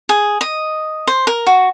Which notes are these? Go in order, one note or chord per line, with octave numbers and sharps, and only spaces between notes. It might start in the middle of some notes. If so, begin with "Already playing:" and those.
G#4
D#5
C5
A#4
F#4